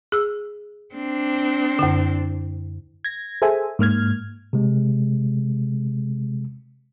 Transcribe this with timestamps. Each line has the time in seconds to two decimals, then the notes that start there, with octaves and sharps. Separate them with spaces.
0.12 G#4 E6
0.94 C4 D4
1.79 F#2 D3
3.04 G#6 A#6
3.42 G#4 A4 C5 E5 G#5
3.79 G#2 A#3 F6 G#6
4.53 C3 G#3